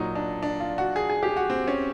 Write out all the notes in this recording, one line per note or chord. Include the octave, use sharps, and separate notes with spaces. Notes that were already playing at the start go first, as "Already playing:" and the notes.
Already playing: A#2 F#3 D#4
D4
D4
F4
F#4
G#4
G#4
G4
F#4
C4
C#4